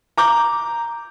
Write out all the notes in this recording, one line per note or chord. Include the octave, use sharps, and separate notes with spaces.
A#5 D6 G6